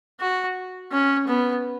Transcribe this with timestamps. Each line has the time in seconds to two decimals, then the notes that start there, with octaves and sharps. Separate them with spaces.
0.20 F#4
0.92 C#4
1.28 B3